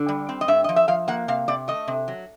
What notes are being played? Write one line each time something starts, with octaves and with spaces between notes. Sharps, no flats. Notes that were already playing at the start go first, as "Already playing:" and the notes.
Already playing: D3
G3
C4
D#5
G2 E5
F3 D#5
E5
F3 F5
A#3 F#5
C3 F5
C3 D5
A3 D#5
C3
F#3